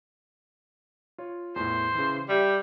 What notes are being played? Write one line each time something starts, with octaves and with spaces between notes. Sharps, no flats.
F4 C#5
E2 A2 C5
C#3 E3
G3 G4 E5 G5